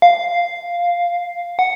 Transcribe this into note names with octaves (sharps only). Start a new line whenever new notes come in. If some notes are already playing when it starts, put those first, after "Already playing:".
F5
F#5